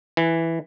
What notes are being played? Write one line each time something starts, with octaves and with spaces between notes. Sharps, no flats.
E3